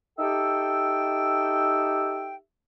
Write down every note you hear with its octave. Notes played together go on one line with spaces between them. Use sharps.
D#4 G4 A4 E5 G5